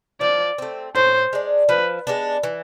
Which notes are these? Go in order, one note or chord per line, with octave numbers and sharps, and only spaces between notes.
F3 D5
A3 C4
A2 C5
G#3 D4
F3 B4
G#3 B3 D4
E3